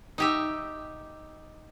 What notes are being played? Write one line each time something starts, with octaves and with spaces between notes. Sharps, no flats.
D#4 G4 E5